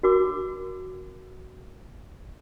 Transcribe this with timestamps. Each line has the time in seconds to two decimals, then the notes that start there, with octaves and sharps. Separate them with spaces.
0.03 F#4 A#4 D6